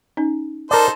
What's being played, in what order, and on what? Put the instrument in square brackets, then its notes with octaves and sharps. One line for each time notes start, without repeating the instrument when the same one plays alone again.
[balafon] C#4 D#4
[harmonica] D#4 A4 C5 [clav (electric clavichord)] A#4 D5 [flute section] A5 A#5